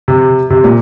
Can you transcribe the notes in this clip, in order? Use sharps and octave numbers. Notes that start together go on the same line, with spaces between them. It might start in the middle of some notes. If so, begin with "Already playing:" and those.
C3
C3
A#2